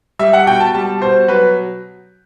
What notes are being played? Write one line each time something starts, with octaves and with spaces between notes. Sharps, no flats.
G3 E5
F#5
B2 G5
A5
G3 A5
B2 C5
F#3 B4